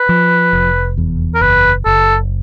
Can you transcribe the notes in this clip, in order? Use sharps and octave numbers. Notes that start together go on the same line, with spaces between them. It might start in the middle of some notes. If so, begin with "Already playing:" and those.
Already playing: B4
F3
F1
E2
A#4
F#1 B4
F#1 A4